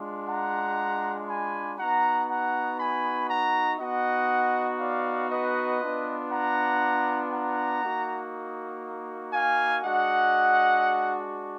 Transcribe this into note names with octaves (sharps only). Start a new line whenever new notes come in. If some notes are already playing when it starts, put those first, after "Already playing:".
Already playing: G#3 D4 F4
F#5 A#5
G#5 B5
B3 D#4 F#4 F#5 A#5
F#5 A#5
G#5 B5
F#5 A#5
B3 D#4 F#4 D#5 F#5
D5 F5
B4 D#5
B3 D4 F4
F#5 A#5
F#5 A#5
A#3 D#4 F#4
F5 G#5
G#3 D4 F#4 D#5 F#5